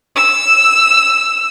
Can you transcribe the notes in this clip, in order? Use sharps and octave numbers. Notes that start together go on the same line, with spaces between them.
E6